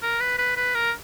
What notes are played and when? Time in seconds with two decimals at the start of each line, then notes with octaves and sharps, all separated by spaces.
0.02 A#4
0.21 B4
0.38 B4
0.57 B4
0.75 A#4